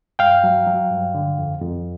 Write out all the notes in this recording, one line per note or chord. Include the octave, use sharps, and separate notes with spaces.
G2 F5 G5
F#3
F#3
G2
D3
F2
F2